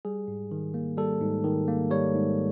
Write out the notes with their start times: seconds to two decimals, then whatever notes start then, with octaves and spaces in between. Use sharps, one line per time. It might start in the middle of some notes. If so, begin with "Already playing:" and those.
0.05 G3 G#4
0.28 G#2
0.51 D#3
0.74 A#3
0.97 G3 A4
1.21 G#2
1.44 D#3
1.68 A#3
1.91 G3 C#5
2.15 G#2